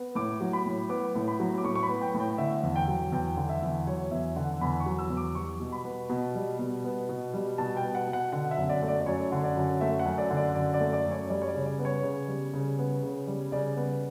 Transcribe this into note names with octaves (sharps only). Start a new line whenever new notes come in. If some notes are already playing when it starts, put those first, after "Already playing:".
Already playing: B3
A2 D6
F#3
B5
A2
B3 D6
A2
B5
F#3
D6
A2 C#6
C#6
B5
B3
G5
A2
G5
D3 E5
E2
G5
F#3
E2 G5
D3
E5
E2
F#3 C#5
E2 E5
D3 F#5
E2 B5
C#6
F#3
E6
E2
D6
G3 C#6
B2
B5
B3
B2
G3
B2
B3
B2
G3
B2 A5
G5
B3
F#5
B2
F#5
D3 F#5
E5
F#2
D5
A3
D5
D5
F#2 C#5
D3
D5
F#2
A3 E5
F#5
F#2
D5
D3
D5
F#2 D5
D5
A3
D5
F#2
C#5
G3 D5
C#5
D5
C#3
D5
B3
C#5
C#3
G3
C#3
B3
C#3
G3
C#3 D5
B3